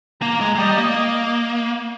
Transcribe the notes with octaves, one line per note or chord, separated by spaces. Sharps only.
A#3 A#5
G#3
G#3
G3 D#5
A#3